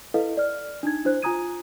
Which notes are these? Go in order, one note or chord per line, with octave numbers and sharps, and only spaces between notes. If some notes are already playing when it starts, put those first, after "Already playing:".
E4 A4 B4 D#5 F5
D5 F6
D4 D#4 G#6
D4 E4 C5 F#6
F4 G#5 A#5 D#6 G#6 D#7